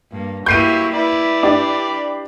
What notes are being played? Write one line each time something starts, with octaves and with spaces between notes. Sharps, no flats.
G2 A#3
F#3 A#3 E4 G4 C#6 G6 C7 D#7
E4 B4 D5 B5
D4 G4